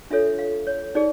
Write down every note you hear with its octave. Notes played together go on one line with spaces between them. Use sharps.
D4 F4 A4 C#5 E5
F5
C#5
D#4 G#4 D5